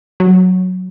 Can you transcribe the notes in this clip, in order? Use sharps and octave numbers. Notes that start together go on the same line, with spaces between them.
F#3